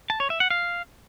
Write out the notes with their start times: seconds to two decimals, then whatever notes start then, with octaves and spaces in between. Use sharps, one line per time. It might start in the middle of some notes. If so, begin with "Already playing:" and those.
0.10 A5
0.20 C#5
0.30 E5
0.40 F#5
0.50 F5